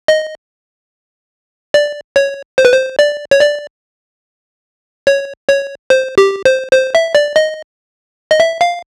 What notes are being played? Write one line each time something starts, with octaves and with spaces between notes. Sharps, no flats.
D#5
D5
C#5
C5
B4
C5
D5
C#5
D5
C#5
C#5
C5
G4
C5
C5
E5
D5
D#5
D#5
E5
F5